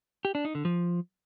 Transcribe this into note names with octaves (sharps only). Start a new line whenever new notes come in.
G4
D4
D#4
D3
F3